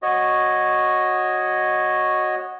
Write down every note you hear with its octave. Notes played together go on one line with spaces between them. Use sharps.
F#4 C#5 D#5